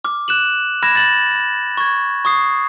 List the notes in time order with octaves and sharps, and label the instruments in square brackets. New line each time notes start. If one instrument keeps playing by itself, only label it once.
[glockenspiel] D6 F6
F#6 E7 F#7
B5 F6 G#6 A#6 E7
A6 F#7
C#6 G#6
C#6 D#6 C7